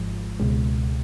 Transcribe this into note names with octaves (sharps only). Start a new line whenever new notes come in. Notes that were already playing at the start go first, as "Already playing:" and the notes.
Already playing: G#1 G#2 F3 G#3
C#2 B2 G#3